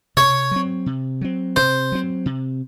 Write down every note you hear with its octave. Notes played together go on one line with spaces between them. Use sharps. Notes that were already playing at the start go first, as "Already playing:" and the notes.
C3 C#5
F#3 C4
C3
F#3 C4
C3 C5
F#3 C4
C3